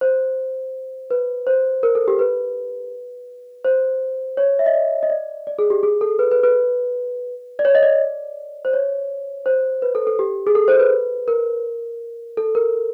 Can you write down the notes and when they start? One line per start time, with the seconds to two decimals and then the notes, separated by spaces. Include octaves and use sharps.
0.01 C5
1.11 B4
1.47 C5
1.83 A#4
1.95 A4
2.08 G4
2.19 B4
3.65 C5
4.37 C#5
4.59 E5
4.66 D#5
4.74 D5
5.03 D#5
5.10 D5
5.47 D5
5.59 G#4
5.70 G4
5.83 G#4
6.01 A4
6.19 B4
6.31 B4
6.43 B4
7.59 D5
7.65 C#5
7.75 D#5
7.83 D5
8.65 C5
8.73 C#5
9.46 C5
9.82 B4
9.95 A4
10.07 A4
10.19 G4
10.47 G#4
10.55 A4
10.68 C5
10.79 B4
11.28 A#4
12.37 A4
12.55 A#4